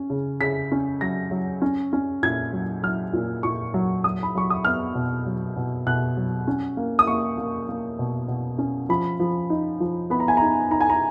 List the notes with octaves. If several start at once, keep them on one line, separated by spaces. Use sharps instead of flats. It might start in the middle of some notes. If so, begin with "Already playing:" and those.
Already playing: C#4
C#3
C#3 B6
C#4
F#3 A#6
F#3
C#4
C#4
A#2 G#6
F#3
F#3 F6
A#2
A#2 C#6
F#3
F#3 D#6
B5
F#3 C#6
D#6
B3 F6
B2
F#3
B2
B2 F#6
F#3
C#4
A#3
D#6
A#3 C#6
A#3
A#3
B2
B2
C#4
F3 B5
F3
D#4
F3
B3 B5
A#5
G#5
D#4 A#5
D#4 A#5
G#5
A#5